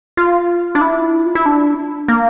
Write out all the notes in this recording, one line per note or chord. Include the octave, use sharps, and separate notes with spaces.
F4
D4
E4
F4
E4
D4
A#3